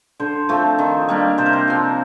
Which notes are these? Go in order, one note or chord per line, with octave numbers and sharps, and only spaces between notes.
D3 C5
F3 A3 C4
D#3
G3 A#3 D4
C3 C5
A#4
C5
F3 C4